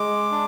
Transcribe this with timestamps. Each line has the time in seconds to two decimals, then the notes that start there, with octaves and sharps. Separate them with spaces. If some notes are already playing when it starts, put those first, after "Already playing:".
Already playing: G#3 D6
0.31 D4